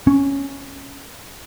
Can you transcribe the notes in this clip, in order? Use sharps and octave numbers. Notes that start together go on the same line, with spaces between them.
C#4